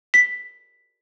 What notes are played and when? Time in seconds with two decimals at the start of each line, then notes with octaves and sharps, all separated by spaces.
0.14 B6